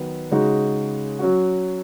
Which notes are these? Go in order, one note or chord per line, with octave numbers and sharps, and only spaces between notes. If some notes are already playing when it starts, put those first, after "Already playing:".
Already playing: D#3 F#3 B3
C#3 G#3 D#4 F#4
F#3 C#4 F#4